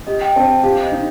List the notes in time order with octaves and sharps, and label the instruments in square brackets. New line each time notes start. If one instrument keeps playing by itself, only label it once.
[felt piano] G4 [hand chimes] D#5
[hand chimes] G5
[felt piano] C4 [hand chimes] A5
[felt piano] G4 [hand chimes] F5
[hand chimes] D#5
[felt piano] D#4